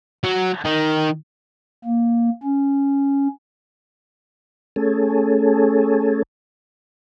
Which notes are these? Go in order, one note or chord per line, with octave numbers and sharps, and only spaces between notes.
F#3
D#3
A#3
C#4
A3 C#4 G#4 A4